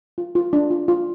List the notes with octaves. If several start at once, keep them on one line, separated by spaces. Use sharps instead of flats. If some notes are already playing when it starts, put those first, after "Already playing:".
F4
F4
D4
F4
F4